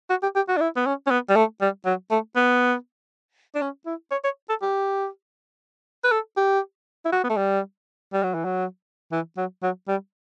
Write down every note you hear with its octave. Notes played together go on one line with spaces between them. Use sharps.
F#4
G4
G4
F#4
D4
E4
B3
C#4
C#4
B3
G3
A3
G3
F#3
A3
B3
D4
C#4
E4
C#5
C#5
A4
G4
B4
A4
G4
E4
F#4
B3
A3
G3
G3
F#3
E3
F#3
E3
F#3
F#3
G3